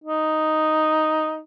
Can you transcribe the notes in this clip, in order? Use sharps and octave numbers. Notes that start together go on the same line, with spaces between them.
D#4